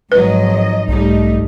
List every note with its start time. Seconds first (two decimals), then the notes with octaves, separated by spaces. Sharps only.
0.12 G#1 G#2 F3 F#3 B4 D#5
0.88 B1 G#2 G3 A3 D#4